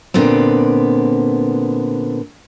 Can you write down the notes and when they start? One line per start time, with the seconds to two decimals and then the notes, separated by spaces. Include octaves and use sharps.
0.14 A#2 D3 B3 C4